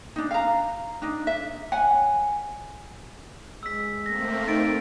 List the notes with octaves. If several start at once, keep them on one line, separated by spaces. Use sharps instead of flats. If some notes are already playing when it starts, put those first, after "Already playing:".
D4 D#4
F5 A#5
D4 D#4
E5
C#5 F#5 G#5
G#3 E6 B6
A3 A#3 C4 A#6
D#4 A6 D7